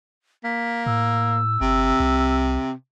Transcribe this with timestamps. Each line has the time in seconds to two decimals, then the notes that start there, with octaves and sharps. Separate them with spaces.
0.44 A#3 B6
0.86 A2 E6
1.61 G1 C3
2.00 C2